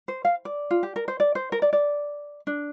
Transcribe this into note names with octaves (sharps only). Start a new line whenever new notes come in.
C5
F5
D5
F4
G4
A#4
C5
D5
C5
A#4
D5
D5
D4